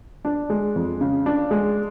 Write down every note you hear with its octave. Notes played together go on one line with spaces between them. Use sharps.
D4
G#3
F2
C#3
D4
G#3